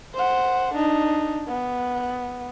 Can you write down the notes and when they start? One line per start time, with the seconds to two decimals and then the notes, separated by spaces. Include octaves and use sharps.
0.14 C5 F#5
0.74 D4 D#4
1.48 B3